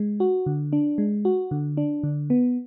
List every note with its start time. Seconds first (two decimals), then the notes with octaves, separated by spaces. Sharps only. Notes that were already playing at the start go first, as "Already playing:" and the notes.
Already playing: G#3
0.20 F#4
0.46 D3
0.73 D4
0.98 G#3
1.25 F#4
1.51 D3
1.77 D4
2.03 D3
2.30 B3